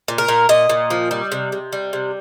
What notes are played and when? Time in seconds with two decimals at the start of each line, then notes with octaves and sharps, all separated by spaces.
0.08 A#2
0.18 A#4
0.28 A#2
0.49 A#2 D#5
0.69 A#2
0.90 F3
1.11 G3
1.32 C3
1.52 C3
1.73 G3
1.93 C3